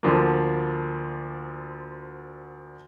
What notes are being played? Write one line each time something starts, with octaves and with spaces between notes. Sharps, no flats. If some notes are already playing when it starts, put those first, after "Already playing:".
D2 D3 F3 A#3